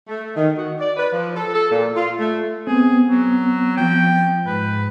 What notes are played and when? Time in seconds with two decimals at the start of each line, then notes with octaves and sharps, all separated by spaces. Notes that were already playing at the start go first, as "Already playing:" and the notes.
0.08 A3
0.36 D#3
0.56 F#4
0.79 D5
0.97 B4
1.12 F3
1.35 A4
1.54 A4
1.71 A#2
1.95 F4
2.18 A3
2.67 B3 C4 G#4
3.10 F#3
3.77 F3 G5
4.46 G#2 B4